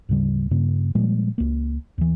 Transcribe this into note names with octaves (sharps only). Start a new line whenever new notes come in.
D2 G#2 C#3 G3
G2 C#3 A#3
A#2 F3 G3 G#3
C#2 A#3
D#2 E3